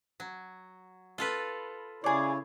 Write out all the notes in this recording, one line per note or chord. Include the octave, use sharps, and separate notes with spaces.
F#3
F4 A4 B4
C#3 E4 G#4 C#5 D5